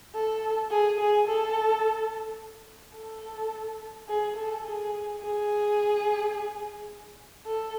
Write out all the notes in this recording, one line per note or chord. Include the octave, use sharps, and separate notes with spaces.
A4
G#4
G#4
A4
A4
G#4
A4
G#4
G#4
A4